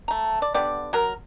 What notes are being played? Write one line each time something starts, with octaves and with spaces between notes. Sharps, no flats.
A3 A#5
D5
D3 B3 G4 D5
F#3 A#4